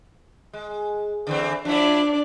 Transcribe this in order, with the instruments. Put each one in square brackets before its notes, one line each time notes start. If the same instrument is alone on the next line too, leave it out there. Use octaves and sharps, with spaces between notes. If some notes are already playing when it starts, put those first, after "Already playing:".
[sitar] G#3
D3 E3 C4
[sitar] F3 E4 [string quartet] D4 D5